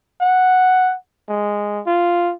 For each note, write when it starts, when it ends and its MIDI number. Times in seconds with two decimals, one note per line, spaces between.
0.21 0.95 78
1.29 1.81 56
1.87 2.34 65